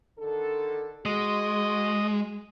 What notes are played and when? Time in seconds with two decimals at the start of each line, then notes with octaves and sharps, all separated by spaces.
0.18 D3 D#3 A4
1.06 G#3 F#4 D#5